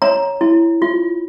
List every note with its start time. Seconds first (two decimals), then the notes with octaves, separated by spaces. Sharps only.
0.02 C#5 A#5
0.41 E4
0.82 F4